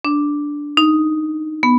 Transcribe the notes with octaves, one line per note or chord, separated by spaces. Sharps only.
D4
D#4
B3